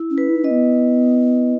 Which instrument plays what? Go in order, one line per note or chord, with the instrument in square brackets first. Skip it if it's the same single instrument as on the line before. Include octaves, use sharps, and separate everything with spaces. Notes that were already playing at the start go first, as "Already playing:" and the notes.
Already playing: [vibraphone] E4
[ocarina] C#4
[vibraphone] B4
[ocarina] E4
D#4
[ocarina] C#4 [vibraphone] D#5
[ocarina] B3